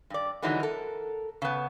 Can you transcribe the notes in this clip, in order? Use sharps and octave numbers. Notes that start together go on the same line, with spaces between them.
G2 D5
D3 E3 F#3 G#3 D#4 E4
A4 A#4
C#3 B3